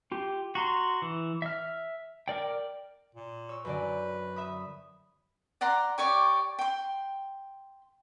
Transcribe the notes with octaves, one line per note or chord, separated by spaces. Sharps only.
F4 G4
F#4 A#5 C6
E3
E5 F6
A#4 D5 G5
A#2
C#5 E6
F#2 D3 B4 D5
E5 B5 D#6
D5 F#5 A#5 C6
G4 C#5 D5 C#6
G5 C6